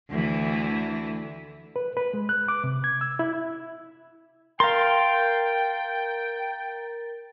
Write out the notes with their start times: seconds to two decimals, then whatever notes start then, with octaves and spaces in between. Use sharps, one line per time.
0.11 D2 E3
1.76 B4
1.97 B4
2.14 G#3
2.29 F#6
2.48 D6
2.64 C3
2.84 G#6
3.01 E6
3.19 E4
4.60 A#4 F5 G5 A#5 C6 A6